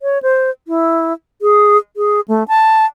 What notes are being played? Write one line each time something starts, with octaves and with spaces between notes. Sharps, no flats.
C#5
C5
E4
G#4
G#4
A3
A5